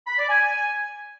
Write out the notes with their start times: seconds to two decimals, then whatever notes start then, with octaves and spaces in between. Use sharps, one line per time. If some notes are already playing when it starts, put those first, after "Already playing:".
0.07 B5
0.18 D5
0.29 G#5